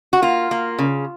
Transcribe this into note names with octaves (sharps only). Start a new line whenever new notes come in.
F#4
A#3 F4
A#3
C#3